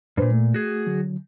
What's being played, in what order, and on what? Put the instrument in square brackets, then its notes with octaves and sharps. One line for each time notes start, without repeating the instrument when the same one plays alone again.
[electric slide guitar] G2 A#2 [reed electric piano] D4 B4 C5
[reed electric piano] A3
[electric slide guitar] F#4 G#4
[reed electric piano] D3 F#3